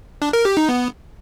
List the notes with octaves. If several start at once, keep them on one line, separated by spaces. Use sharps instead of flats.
D4
A#4
G4
D#4
B3